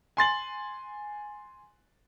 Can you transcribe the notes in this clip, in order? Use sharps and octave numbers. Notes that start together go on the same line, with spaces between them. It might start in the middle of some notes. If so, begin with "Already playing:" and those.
G#5 C6 A6 F#7